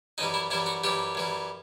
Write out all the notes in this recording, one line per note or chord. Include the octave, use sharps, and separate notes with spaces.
F#2 E3 G3 D#4
E4
F#2 E3 G3 E4
F#4
F#2 E3 G3 G4
F#2 E3 G3